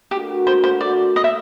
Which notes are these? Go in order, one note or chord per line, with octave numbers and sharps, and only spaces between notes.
A3 D4 F#4 G4 A#4
C5
C5
D5
D#5
E5